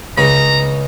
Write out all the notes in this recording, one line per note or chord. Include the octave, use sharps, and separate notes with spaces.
C#2 C#3 A#5